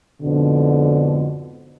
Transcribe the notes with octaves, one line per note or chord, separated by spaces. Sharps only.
F2 G#2 B2 D3